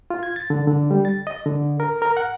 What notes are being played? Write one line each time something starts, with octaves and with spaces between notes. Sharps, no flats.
F4
G#6
A6
D3
D3
G3
A6
D#5
D3
A#4
A#4
F#5